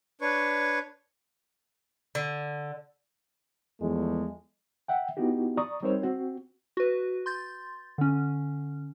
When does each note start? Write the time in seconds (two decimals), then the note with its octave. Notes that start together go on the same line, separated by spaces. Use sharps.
0.21 D4 B4 C#5 C#6
2.15 D3
3.81 E2 F3 G#3 A3
4.88 E5 F#5 G5
5.17 B3 D#4 E4 F#4 G4
5.57 D5 A#5 C#6 D#6
5.83 G3 C4 D#4 A#4 C5 C#5
6.03 C4 F#4
6.77 F#4 B4
7.26 C6 G6 A6
7.98 D3 C#4